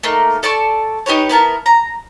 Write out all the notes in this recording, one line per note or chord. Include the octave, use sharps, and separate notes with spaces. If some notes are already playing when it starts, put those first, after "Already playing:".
A3 A#3 D#4
A4 D5 A5 C#6
D#4 G4 B4 C#5
B3 E4 A#4 A5
A#5